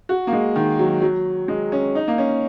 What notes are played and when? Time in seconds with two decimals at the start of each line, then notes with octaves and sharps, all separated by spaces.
0.09 F#4
0.27 A#3
0.33 G#3
0.56 D#3
0.79 F#3
1.02 F#3
1.48 G#3
1.72 C#4
1.95 D#4
2.08 A#3
2.18 C#4